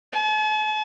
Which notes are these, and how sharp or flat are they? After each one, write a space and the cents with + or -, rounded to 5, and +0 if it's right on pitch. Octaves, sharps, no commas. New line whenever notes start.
A5 -45